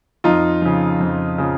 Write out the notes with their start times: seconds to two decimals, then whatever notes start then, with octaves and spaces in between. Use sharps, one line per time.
0.24 F2 D#4 F4
0.62 C#3 F3
1.00 F2
1.38 C#3 F3